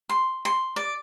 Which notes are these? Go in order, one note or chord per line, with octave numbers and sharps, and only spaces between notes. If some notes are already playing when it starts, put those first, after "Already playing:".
C6
C6
D5